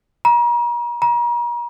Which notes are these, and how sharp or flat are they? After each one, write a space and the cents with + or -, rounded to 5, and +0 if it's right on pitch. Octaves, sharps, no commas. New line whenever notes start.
A#5 +40
A#5 +40